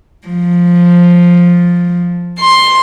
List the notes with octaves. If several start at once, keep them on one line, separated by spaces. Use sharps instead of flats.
F3
C6